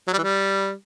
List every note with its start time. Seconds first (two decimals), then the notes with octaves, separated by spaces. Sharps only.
0.07 F#3
0.13 G3
0.18 E3
0.23 G3